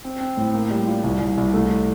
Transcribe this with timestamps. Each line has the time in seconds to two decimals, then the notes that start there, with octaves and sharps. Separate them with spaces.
0.05 C4
0.21 C4
0.37 A2
0.54 A#3
0.71 G3
0.87 F4
1.04 C2
1.20 C2
1.37 C2
1.54 A3